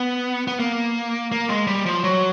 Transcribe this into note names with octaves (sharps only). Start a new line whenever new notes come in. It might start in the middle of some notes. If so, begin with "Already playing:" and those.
Already playing: B3
B3
A#3
A#3
G#3
G3
F3
F#3